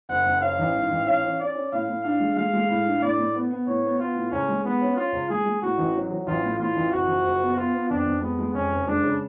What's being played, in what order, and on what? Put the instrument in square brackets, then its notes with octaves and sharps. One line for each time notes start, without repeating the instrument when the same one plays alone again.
[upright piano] F#1 [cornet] F#5
[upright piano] F#1
[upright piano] C#4 [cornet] F5
[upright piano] A1
G#2
A1
[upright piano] C#4 [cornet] F5
[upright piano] C#4
[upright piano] C#4 [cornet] D5
[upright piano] C#4
[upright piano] A2 [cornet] F5
[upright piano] A2
[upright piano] D4 [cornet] F5
[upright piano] G#3
[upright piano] G#3 [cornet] F5
[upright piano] G#3
A2
D4
[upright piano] A2 [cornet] D5
[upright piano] A2
B3
B3
[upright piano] A2 [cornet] C#5
[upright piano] B3
[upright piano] B3 [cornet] F4
[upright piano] A2
[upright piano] C#2 [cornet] C#4
[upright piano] G#3
[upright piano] G#3 [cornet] B3
[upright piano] C#4
[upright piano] C#4 [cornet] F4
[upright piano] C#2
[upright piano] G#3 [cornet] G#4
[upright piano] G#3
[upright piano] A2 [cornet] F#4
[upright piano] A1
F#3
F#3
[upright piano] A1 [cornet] F4
[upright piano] A2
[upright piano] A2 [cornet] F4
[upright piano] A1
[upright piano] F#1 [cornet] F#4
[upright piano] F3
F#1
B3
[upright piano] B3 [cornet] F4
[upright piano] B3
[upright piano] F2 [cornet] D4
[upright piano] F2
[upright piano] G#3 [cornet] B3
[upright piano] G#3
[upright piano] F2 [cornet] C#4
[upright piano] F#1
[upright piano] G#3 [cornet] D4
[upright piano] C#3